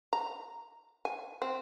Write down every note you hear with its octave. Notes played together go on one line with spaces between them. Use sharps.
A#5
G#5
C4